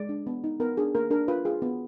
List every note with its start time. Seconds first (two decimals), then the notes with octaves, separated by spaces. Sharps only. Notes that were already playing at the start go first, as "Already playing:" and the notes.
Already playing: G#3 D5
0.09 D4
0.27 B3
0.44 D#4
0.60 B3 A#4
0.77 D4 G#4
0.95 A#3 A#4
1.11 D4 A#4
1.28 F4 B4
1.45 F4 G#4
1.62 B3